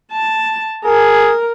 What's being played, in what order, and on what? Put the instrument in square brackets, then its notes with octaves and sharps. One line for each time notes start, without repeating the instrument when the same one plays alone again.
[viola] A5
[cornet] G#4 [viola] A#4